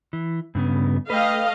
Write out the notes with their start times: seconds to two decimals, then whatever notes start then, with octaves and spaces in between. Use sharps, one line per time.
0.13 E3
0.55 G2 C#3 B3
1.10 A3 B4 D#5 F5 G5